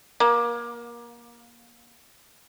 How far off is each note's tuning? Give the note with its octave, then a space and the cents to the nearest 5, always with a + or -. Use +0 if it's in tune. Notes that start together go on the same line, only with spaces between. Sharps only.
A#3 +25